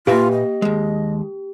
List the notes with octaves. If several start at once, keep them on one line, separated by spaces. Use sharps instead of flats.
A#2 A#3 F4 G4 B4 E5 F5
D#5
D#2 G#3